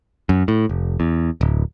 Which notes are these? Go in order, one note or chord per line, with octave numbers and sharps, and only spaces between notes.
F#2
A2
F1
E2
D1